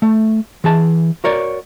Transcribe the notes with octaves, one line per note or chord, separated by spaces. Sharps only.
A3
E3 G#4 A5
F#4 A#4 C#5 D5